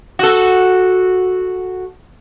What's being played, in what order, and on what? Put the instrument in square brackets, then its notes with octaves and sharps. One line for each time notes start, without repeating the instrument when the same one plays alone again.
[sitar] F#4 A4